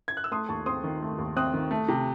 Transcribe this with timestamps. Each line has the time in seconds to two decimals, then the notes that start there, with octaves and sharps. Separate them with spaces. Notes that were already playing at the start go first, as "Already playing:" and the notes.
0.08 G#6
0.17 F#6
0.24 E6
0.31 A3 C6 D#6
0.49 D#2 A5 C#6
0.66 C4 C6 D#6
0.84 D#3
1.02 A3
1.18 D#2
1.36 C4 D#6 F#6
1.53 D#3
1.71 A3
1.88 C3